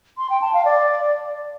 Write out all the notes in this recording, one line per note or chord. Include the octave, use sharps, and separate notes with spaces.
C6
G5
A5
F5
D5